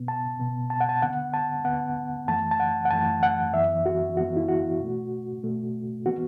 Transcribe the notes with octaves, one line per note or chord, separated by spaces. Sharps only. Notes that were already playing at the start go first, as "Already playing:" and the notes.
Already playing: B2 B3
A5
B2 B3
A5
F#5
A5
D2 D3 B3 F#5
A5
D2 D3 B3 F#5
F#2 E3 A3 A5
A5
F#5
F#5
F#2 E3 A3 A5
F#5
F#2 E3 B3 E5
F#4
F#2 E3 B3 F#4
E4
F#4
B2 A3
B2 A3
E3 B3 F#4